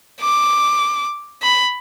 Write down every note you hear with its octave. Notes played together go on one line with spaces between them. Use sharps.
D6
B5